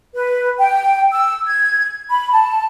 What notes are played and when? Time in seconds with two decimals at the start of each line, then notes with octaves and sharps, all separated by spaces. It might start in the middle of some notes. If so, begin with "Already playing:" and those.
0.15 B4
0.58 G5
1.12 E6
1.46 G#6
2.10 B5
2.32 A5